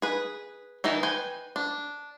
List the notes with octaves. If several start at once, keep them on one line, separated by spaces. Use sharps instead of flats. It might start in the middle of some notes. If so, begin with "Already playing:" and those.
G#4 B4
D#3 E3 D#4 E4
B4 G5 G#5
D4